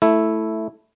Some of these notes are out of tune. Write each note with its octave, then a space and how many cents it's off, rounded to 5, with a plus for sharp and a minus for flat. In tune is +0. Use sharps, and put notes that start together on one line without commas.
A3 +0 E4 +0